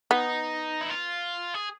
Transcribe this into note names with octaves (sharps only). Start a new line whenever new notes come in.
B3 D#4
E4
F4
G#4